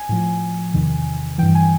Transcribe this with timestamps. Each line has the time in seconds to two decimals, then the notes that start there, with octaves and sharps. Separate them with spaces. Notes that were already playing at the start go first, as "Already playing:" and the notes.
Already playing: G#5
0.09 A2 F3
0.74 E2 C3 D#3
1.38 G2 E3 G5
1.55 G#5